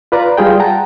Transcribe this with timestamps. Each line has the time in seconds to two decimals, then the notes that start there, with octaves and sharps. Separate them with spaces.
0.12 F4 B4 D5 A#5
0.37 G3 F4 G#4 G5
0.60 F#5 G5 A5 A#5